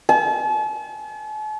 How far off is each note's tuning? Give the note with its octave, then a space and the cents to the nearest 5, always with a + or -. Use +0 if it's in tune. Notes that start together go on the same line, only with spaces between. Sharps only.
A5 -45